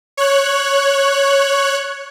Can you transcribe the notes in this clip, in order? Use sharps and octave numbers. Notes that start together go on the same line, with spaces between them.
C#5 F#6